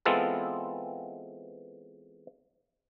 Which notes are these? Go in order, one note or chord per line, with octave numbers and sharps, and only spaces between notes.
E3 G#3 B3 C4 F4 A4